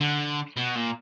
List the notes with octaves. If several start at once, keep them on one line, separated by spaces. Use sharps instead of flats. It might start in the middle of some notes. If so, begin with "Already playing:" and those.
D3
B2
A#2